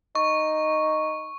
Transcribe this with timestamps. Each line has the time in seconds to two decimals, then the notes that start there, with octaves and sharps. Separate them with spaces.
0.15 D#4 C#6